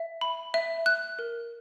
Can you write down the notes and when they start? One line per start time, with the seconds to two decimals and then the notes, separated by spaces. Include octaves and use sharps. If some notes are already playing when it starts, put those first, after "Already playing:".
Already playing: E5
0.21 B5
0.54 E5
0.86 F#6
1.19 A#4